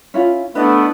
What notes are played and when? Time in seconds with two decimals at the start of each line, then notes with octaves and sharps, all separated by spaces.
0.14 C#4 E4 F4
0.55 A3 B3 D4 E4 B4 D#5